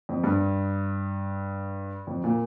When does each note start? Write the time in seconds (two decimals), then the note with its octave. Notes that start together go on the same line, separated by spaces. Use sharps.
0.09 F2
0.24 G2
2.07 F2
2.24 A#2